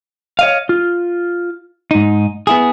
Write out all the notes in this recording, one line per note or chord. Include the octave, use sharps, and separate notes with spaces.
C#5 D#5 F5
F4
G#2 D#4
B3 E4 G#4